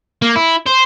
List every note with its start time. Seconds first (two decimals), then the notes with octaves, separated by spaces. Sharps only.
0.22 A#3
0.36 E4
0.67 C5